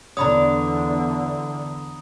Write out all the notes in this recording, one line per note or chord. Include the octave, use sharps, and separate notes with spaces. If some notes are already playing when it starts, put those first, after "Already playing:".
E2 D3 D4 C#5 A#5 B5 D#6